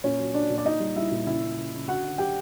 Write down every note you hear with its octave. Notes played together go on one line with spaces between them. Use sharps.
A#2 C#4 C#5
F#3
F#3 D4 D5
A#2
D5
A#2 D#4 D#5
G3
G3 E4 E5
A#2
C#3 E4 E5
C#3
C#3
C#3
D3 F#4 F#5
D3
F#3 G4 G5